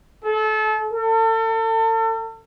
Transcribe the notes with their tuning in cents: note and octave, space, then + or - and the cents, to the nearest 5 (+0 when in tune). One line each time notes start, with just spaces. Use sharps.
A4 -30
A4 +35